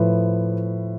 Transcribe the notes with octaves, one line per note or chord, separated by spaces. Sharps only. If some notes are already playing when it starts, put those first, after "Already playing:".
Already playing: A2 F3 B4